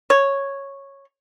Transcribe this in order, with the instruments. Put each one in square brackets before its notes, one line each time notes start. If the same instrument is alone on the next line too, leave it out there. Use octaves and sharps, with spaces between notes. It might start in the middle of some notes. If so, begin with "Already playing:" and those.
[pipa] C#5